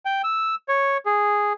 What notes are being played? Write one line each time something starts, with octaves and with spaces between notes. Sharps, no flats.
G5
E6
C#5
G#4